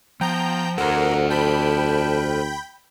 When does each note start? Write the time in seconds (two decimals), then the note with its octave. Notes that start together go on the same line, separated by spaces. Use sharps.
0.21 F3 B3 G5 A#5 G6
0.78 D2 A4 A#4 C5 F#5
1.30 G5 A5 B5 G6